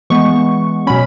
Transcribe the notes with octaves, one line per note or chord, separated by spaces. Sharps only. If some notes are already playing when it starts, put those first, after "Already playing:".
E3 G#3 B3 C#6
B2 F#3 C#4 B5